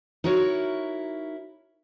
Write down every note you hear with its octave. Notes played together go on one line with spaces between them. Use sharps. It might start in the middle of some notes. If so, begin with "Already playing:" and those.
D#4 E4 F#4 A#4 C#5